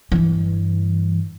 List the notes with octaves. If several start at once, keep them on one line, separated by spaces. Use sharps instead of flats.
G2 E3